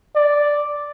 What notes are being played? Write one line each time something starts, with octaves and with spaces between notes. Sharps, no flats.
D5